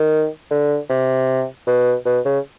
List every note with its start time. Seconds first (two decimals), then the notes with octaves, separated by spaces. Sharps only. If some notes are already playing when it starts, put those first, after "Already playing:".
Already playing: D#3
0.51 D3
0.90 C3
1.67 B2
2.06 B2
2.25 C#3